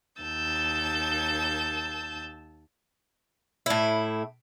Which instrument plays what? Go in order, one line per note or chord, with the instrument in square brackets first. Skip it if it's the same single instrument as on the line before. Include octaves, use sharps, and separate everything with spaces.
[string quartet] D#2 A5 E6 G6
[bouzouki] A2 E4